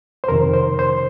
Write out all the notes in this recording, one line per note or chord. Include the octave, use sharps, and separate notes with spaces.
C5
F2 C3 D#3 A#4
C5
C5